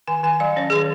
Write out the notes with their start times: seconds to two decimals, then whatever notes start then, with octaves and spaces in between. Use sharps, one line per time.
0.08 D#3 G#5
0.23 D#3 G#5
0.40 F#3 F5
0.56 C#4 C#5
0.70 D#3 G#4